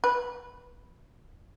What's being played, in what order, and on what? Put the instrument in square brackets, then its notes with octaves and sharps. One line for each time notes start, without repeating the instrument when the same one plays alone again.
[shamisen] B4